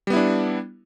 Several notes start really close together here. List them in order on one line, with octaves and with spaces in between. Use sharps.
G3 B3 E4 D4